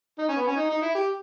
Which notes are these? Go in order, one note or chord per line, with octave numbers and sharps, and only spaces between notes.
D#4
C#4
B3
C#4
D#4
D#4
E4
G4